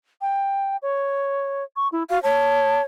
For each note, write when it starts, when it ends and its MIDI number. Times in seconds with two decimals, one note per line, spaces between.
0.21 0.77 79
0.82 1.64 73
1.76 1.88 85
1.92 2.03 64
2.10 2.19 66
2.10 2.21 77
2.23 2.83 73
2.23 2.82 81